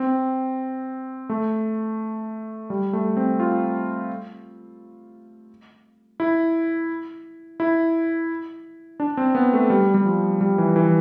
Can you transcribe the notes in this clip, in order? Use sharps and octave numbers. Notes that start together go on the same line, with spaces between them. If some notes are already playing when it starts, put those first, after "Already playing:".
Already playing: C4
A3
G3
A3
C4
F4
E4
E4
D4
C4
B3
A3
G3
G3
F3
G3
E3
E3